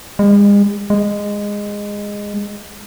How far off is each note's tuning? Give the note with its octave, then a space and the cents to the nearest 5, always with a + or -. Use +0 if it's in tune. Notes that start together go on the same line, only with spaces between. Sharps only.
G#3 -40
G#3 -15